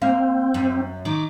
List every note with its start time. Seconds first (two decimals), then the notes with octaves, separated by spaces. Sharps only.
0.02 A#3 C4 F5
0.54 F#2
1.05 D#3 D6